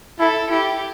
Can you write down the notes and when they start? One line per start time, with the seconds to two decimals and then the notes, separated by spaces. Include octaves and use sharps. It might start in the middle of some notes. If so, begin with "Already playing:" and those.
0.19 E4 A4
0.49 E4 G4